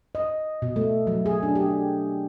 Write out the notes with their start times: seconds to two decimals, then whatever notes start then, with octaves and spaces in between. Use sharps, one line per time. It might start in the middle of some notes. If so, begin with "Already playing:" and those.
0.15 D#5
0.62 B2
0.76 A3
1.07 F#3
1.26 G#4
1.43 D4
1.55 G4